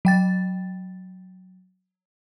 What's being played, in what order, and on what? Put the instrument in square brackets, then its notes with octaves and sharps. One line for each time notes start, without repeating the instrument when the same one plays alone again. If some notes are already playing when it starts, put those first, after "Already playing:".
[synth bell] F#3 G5 A6